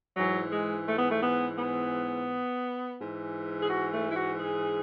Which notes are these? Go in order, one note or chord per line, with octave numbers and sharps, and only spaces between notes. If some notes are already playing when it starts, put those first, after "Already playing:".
G#2 E3 F#3
G#3
A3
B3
A3
B3
B3
G#2 E3
G#4
F#4
A3
E4
F#4
G#4